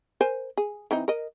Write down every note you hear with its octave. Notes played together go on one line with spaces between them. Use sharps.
A#4 C5 G#5
G#4
E3 C4 D#4
A#4 D#5